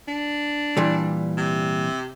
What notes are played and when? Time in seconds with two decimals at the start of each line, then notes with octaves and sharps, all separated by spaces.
0.08 D4
0.77 A#2 E3 G3
1.37 C3